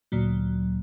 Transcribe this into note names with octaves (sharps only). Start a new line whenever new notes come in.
D2 A#2 F#3